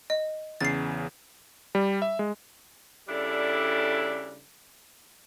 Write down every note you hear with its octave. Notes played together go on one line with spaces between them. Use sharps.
D#5
E2 C#3 A6 C7
G3
E5
G#3
C#3 G3 D4 E4 A4